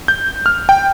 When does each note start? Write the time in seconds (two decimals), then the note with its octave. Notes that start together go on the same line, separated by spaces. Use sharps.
0.08 G6
0.46 F6
0.69 G5